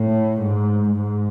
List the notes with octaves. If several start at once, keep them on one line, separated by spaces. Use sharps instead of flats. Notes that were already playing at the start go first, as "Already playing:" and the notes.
Already playing: A2
G#2
G#2